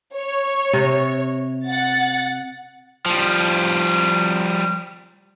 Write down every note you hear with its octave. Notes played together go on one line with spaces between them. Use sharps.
C#5
C3
F#5 A6
F3 G3